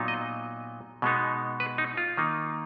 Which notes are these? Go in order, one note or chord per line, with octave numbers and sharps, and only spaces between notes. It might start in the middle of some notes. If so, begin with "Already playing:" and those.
Already playing: A#2 F#3 B3 D#4
D#5
B2 G#3 B3 D#4
B4
D#4
F4
D#3 A#3 D#4